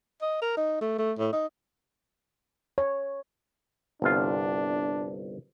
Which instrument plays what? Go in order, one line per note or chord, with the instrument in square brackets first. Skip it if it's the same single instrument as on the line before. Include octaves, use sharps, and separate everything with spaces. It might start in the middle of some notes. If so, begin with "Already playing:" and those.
[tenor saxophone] D#5
A#4
D#4
A3
A3
A2
D#4
[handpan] C#5
[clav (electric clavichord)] G1 C2 F4 [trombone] D4